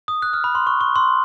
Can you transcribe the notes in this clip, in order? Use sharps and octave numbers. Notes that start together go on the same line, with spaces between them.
D#6
F#6
F6
B5
C6
C#6
C#6
C6